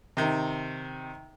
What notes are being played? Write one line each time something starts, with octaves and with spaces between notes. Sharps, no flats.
C3 D#3